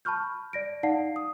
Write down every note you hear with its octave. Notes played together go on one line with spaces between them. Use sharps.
A5 B5 C#6 F6 G6
D5 A#6 D7
D#4 D5 F5 F#5 A5 C7
D#6